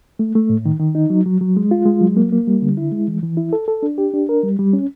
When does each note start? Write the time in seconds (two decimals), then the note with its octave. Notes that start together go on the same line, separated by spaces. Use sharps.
0.19 A3
0.35 A3
0.49 A2
0.66 D#3
0.80 D#3
0.95 D#4
1.10 F#3
1.26 F#3
1.41 F#3
1.57 G#3
1.71 F4
1.86 G#3
2.01 F#3
2.17 A#3
2.32 A#3
2.47 G3
2.62 D3
2.77 E4
2.92 G#3
3.08 E3
3.23 E3
3.37 E4
3.53 A4
3.68 A4
3.83 D4
3.98 G4
4.13 D4
4.29 A#4
4.43 G3
4.59 G3
4.73 C#4